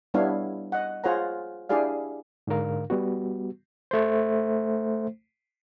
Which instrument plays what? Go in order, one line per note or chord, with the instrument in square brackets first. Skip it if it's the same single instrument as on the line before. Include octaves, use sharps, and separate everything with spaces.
[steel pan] G3 B3 D4 E4 C#5 F5
D#5 F#5
F4 G#4 C5 C#5 F#5 A#5
D4 E4 G4 G#4 D5 F5
[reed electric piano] G#2 D3 D4 A#4 F5
G3 B3 F#4
[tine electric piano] A3 C5